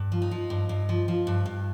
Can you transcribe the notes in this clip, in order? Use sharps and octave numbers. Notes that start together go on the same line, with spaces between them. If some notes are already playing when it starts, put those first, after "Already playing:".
Already playing: G2
F3
D#4
F3
G2
G2
F3
F3
G2
G2